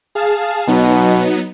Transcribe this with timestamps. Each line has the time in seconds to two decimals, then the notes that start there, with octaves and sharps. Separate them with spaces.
0.15 G#4 F5 A5
0.68 B2 F#3 B3 D#4